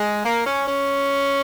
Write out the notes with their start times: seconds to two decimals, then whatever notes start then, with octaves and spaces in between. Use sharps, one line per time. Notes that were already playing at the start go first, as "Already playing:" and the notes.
Already playing: G#3
0.24 A#3
0.46 C#4
0.68 C#4